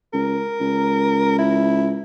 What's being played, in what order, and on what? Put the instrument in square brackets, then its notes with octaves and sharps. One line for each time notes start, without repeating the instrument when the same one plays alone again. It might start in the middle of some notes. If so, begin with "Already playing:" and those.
[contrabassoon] C#2 [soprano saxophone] A#4
[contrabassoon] C#2
[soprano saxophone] E4